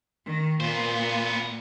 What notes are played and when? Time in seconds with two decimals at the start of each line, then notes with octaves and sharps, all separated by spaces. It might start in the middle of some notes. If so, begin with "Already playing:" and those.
0.25 D#3
0.60 A#2 A#3 B3 C5